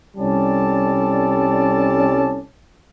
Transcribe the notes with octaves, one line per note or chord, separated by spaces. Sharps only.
C2 G3 C#4 A4 D5 A5